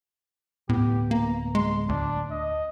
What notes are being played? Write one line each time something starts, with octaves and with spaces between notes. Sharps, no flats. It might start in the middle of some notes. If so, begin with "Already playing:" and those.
D1 A2 B3 G4
A#3 A#5
G#3 C6
D2 D4
D#5